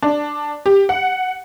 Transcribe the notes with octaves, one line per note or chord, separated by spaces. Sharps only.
D4
G4
F#5